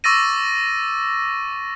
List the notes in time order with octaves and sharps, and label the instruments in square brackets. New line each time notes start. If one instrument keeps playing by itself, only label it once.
[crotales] C#6 D6 E6 A6 A#6 D#7